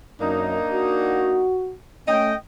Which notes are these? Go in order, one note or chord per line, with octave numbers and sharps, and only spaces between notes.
F#2 A#3 D4 D#4
F#4
A3 C#4 D#5 G5